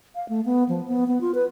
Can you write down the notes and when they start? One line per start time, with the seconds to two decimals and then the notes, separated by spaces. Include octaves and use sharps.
0.15 F5
0.29 A3
0.45 B3
0.69 F3
0.88 B3
1.07 B3
1.21 F4
1.35 B4